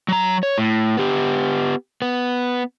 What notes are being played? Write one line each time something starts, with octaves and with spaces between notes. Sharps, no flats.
F#3 A#5
C#5
A2
B3 G4
B3